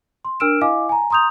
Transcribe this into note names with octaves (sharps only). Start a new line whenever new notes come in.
C6
D4 A#4 E6 F6 D7 E7
E4 D#5 F5 G#5 D6
G#5 A#5
A#5 C6 D#6 G6 F7